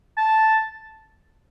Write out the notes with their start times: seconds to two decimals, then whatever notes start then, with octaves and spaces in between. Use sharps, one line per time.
0.17 A5